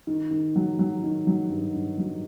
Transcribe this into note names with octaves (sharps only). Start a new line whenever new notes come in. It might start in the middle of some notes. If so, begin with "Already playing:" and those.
D#3
D#3
F#3
F#3
D#3
F#3
G2
G2
F#3